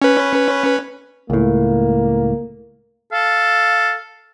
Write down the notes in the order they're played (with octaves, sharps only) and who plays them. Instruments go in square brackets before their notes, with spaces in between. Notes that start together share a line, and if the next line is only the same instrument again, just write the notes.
[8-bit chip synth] C#4 B4
[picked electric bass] C#2 A2 [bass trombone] A#3
[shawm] A4 [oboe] F5